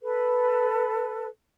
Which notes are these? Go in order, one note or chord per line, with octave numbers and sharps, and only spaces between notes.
A4 B4